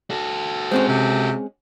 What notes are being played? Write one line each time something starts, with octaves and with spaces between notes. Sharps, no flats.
F#4 A4
G#3 C4 C#4 C5
C3